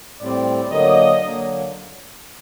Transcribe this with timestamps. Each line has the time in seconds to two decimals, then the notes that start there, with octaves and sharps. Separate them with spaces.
0.19 A2 G3 C4 D5
0.70 D3 F#3 A#3 D#5
1.22 D3 F#3 A#3